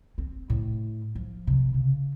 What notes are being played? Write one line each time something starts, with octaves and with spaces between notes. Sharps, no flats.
C4
A2
F3
C3
C#3